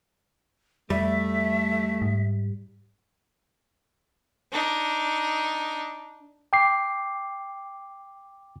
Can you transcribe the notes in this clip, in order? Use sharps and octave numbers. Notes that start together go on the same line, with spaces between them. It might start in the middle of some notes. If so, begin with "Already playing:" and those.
F2 G3 A3 E5
G#2
D4 D#4
G5 D6 C7